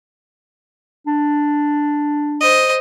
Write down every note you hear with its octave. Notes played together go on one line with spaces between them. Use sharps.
D4
C5 D#5